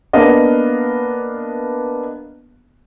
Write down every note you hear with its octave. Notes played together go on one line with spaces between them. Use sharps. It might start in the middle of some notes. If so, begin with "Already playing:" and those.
A#3 B3 D4 D#5 F5